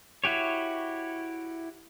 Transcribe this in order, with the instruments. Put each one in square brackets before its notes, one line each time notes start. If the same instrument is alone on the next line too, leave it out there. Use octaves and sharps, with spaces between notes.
[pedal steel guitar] E4 F#4 G4 C#5